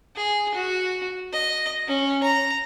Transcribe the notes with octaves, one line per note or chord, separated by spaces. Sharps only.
G#4
F#4
D#5
C#4
A#5